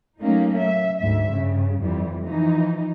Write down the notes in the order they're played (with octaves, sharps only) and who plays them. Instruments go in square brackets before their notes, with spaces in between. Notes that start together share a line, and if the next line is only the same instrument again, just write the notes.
[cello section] F#3 A3 A#3 C#4 D#4
E5
D2 G#2 E5
G2 C#3
F2 E3 G3
E3 F3 D#4